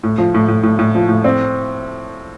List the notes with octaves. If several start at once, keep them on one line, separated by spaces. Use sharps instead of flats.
A2
F3
A2
A2
A2
A2
F3
A2
C4